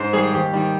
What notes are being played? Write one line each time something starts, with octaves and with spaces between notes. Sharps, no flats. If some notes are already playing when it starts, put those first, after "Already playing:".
Already playing: G#2 C5
D#3 G3 G#4
D#2 G4
D#3 G3